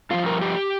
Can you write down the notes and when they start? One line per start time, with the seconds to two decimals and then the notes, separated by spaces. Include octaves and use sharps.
0.11 G2 F3 F4
0.26 A#4
0.41 G4